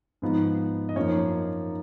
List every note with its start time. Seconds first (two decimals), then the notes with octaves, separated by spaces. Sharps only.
0.22 G#2 F3 B3 D#4
0.89 D#5
0.96 F#2 F3 A#3 D#4 C#5